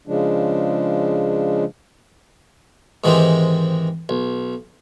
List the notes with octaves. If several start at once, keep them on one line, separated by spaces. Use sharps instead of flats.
C#3 F3 G#3 D4
G#2 D#3 E3 G#3 C4 G4
B1